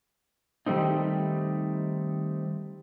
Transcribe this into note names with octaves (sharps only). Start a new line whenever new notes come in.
D#3 G3 A3 C4 D#4